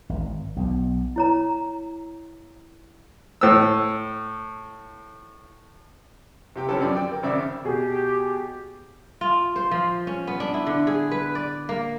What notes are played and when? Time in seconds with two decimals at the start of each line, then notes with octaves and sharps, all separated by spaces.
0.09 G#1
0.56 B1
1.16 E4 C#5 A#5
3.41 A2 E6
6.56 C3 G4 G5
6.68 D3 F3 C#4 G4 A4 B4
6.80 F#2 D5
6.95 D5 G5
7.11 A#4
7.23 G#1 C#3 C4 D5 E5 D6
7.65 B2 G4 G#4
9.21 F4
9.56 C5
9.71 F3
10.07 C#4
10.27 B3
10.40 D4
10.54 E4
10.67 D3
10.87 G#4
11.11 B4
11.35 D5
11.69 A#3